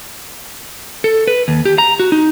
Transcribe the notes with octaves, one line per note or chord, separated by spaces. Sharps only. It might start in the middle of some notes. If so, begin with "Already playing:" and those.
A4
B4
D#2
G4
A#5
F#4
D#4